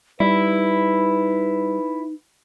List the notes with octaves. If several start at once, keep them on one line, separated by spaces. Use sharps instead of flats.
G3 D#4 E4 B4